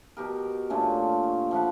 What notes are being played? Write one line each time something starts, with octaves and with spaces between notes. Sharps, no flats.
B2 G4 A#4
A#2 D3 A3 C#4
F3 F5 F#5 B5